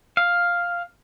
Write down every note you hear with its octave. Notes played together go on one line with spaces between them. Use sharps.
F5